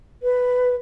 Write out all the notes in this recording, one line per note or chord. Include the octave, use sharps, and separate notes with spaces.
B4